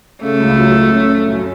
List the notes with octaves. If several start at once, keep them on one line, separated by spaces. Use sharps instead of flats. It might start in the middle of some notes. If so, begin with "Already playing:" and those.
C#3 A3
C#2
F#3
C#4
C#4
C#4
F#2